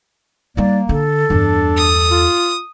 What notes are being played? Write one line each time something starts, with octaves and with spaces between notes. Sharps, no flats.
G3 A#3 D#4 D5
D3 A4
E2 G2 D4
D#6
F4